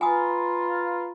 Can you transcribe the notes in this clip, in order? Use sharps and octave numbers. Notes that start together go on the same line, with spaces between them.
F4 B4 G#5 A#5 B5 D#6